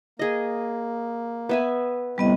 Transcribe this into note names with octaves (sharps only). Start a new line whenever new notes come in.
A#3 G#4 D#5
B3 E5 G#5
A2 C3 G3 B3 D#5